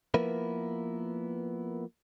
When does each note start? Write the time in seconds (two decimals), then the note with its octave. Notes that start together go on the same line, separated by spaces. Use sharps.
0.14 F3 A#3 B3 E4 A#4 B4